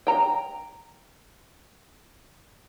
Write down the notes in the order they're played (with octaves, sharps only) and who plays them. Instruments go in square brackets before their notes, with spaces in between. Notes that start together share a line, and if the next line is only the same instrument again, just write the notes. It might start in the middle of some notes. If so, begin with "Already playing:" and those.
[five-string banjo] G5 A#5